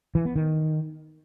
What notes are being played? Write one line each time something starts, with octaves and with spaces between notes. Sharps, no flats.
E3
B3
D#3